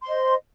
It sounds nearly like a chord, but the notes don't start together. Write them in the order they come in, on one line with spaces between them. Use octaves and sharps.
C6 C5 D#5